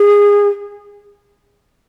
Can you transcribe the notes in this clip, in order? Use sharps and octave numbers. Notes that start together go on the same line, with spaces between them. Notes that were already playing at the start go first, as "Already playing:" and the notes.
Already playing: G#4